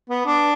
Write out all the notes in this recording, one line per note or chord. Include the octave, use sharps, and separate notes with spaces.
B3
D4